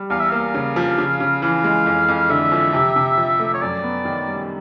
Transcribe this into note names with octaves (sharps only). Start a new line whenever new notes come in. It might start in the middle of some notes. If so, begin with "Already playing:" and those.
Already playing: G3
E2 F5
E5
A#3 F5
C#3
F3
C#3
C#3
E3 F5
G#3
F2
F2
D3 E5
F3
C3
C3
F3
A3
C#5
F#2 D5
B3
D#3
G3